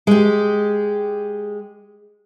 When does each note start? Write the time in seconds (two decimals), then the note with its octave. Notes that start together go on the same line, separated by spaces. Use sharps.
0.07 G#3 G4